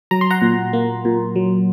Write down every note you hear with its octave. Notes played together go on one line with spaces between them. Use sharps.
F#3 A#5
C6
F#5 A#5
A#2
A#3
A#2
F#3